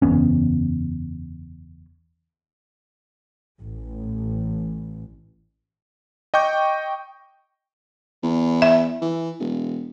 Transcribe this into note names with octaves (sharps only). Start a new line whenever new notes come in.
F#1 E2 B3 C#4
A1
D#5 G5 C#6 D6 G6
E2
E5
E3
E1